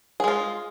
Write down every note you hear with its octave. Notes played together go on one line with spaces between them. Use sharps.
G#3 F4 G#4